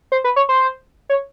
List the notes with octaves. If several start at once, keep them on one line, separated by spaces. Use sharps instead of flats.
C5
B4
C#5
C5
C#5